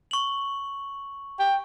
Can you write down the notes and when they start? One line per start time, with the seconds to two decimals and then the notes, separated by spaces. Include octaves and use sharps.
0.11 C#6 F#7
1.40 G5